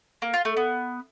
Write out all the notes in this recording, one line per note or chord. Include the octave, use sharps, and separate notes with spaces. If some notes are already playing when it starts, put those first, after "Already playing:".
A#3
F4
A3
B3